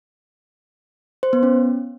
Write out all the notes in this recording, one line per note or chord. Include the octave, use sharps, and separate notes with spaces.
C5
B3
C#4